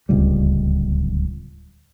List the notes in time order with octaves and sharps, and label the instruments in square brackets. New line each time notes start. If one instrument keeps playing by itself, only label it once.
[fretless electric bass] D1 C#2 G3